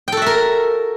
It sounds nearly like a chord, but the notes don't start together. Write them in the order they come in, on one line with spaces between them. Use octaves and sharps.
G5 A4 F#4 E5 A#4